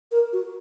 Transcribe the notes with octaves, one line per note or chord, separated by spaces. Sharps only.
A#4
F#4